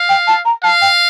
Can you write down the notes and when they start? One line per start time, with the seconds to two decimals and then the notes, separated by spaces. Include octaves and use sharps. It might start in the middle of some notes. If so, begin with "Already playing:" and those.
Already playing: F5
0.09 G5
0.27 A5
0.45 A#5
0.64 F5 A5
0.81 G5